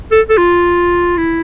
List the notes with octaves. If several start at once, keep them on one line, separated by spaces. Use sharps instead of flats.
A4
A4
F4
E4